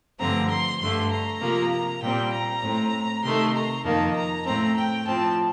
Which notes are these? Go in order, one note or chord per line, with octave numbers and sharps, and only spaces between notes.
G2 D3 F3 A3 C4 A#5
C6
G2 D3 A3 C6
A#5
C3 F3 A#3
A#2 G3 C4 G5
A#5
A2 A3 C4
C3 D#3 A3 C6
A#5
F2 D#3 A#3 A5
A#5
A2 A3 C4 A#5
G5
A2 F3 C4 A5